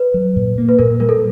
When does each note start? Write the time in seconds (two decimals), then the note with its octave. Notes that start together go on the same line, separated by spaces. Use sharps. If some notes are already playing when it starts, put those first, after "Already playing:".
Already playing: B4
0.14 F#3
0.36 A#2
0.58 A#3
0.69 B4
0.79 A#2 A#4
1.00 G3 A#4
1.09 A4